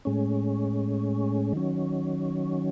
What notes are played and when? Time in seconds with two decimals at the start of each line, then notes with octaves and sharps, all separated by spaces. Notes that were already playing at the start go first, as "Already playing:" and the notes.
0.05 A2 G#3 C#4
1.53 D#3 F#3 C#4